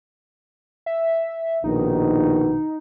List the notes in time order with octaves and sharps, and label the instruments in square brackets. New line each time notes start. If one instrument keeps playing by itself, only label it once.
[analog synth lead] E5
[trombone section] A#1 B2 D#3 [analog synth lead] D#4